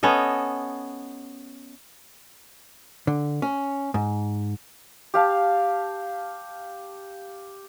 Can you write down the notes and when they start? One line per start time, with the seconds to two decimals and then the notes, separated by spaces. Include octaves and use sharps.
0.03 B3 C#4 A4 D#5
3.07 D3
3.42 C#4
3.94 G#2
5.14 G4 F5 A5